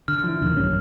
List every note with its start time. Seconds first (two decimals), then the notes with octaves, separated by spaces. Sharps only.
0.08 D3 F6
0.24 F3 E4
0.42 D#2 A#2 D3 D#3
0.57 A#1 F#2 G3 C#4